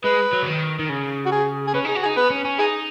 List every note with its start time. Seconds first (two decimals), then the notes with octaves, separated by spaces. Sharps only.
0.04 G#3 B4
0.33 F#3
0.43 C#3
0.47 D#3
0.79 D#3
0.89 C#3
1.26 F#4
1.32 G#4
1.67 G#4
1.74 C#4 B4
1.85 D#4 G#4
1.95 F#4
2.03 G#4
2.06 D#4
2.17 B3 B4
2.30 C#4
2.45 C#4
2.59 D#4 G#4